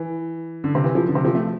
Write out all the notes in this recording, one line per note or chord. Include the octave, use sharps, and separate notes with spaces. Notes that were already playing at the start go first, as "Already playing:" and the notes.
Already playing: E3
D3
C3
E3
F3
D3
C3
F3
A3